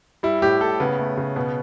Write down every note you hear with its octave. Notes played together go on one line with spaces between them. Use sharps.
G3 E4
A2 G4
A2 A4
C#3 B3
A3
C#3
B2 B3